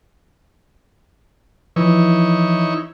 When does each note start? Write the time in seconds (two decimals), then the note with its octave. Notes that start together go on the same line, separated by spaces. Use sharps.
1.76 E3 F3 D#4 E4 C#5